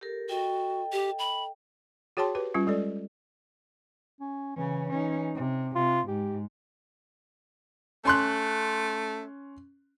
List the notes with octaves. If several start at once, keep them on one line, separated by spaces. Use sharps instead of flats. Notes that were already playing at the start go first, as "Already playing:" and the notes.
G4 A4 A#4
F#4 A4 D#5 G5
G4
B5
F#4 G#4 C#5 G5 A5 C6
G4 B4
G3 C#4 F4
G#3 A4 D5
C#4
C#3 E3 C#4
C#4 D#4
C3
C3 F4
G#2 G4
A3 C#4 C6 F#6